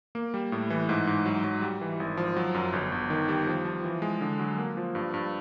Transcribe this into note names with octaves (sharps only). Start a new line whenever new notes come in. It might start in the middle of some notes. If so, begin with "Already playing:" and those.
A#3
G3
A2
E3
G#2
G#2
F#3
F#3
G3
E3
G#1
F3
F#3
F#2
G1
G1
D#3
G3
F3
F3
E3
G#3
D3
F#3
A#3
F3
G2
G2